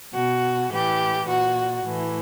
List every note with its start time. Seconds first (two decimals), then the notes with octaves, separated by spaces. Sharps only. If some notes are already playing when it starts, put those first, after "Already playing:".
0.13 B2 F#4
0.71 A2 E3 G4
1.27 A#2 F#4
1.86 A2 E3